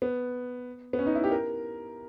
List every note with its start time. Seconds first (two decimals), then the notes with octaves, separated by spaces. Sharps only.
0.02 B3
0.93 B3
0.99 C#4
1.06 D#4
1.15 E4
1.24 G4
1.31 A#4